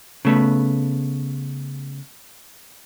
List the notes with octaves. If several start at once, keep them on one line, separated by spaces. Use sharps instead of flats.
C#3 A3 B3